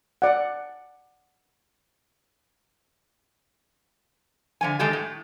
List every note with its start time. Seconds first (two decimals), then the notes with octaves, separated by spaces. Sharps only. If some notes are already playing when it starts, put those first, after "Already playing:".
0.22 D5 F#5
4.61 D3 F3 G#5
4.79 D#3 G#3 G4 A4
4.93 A2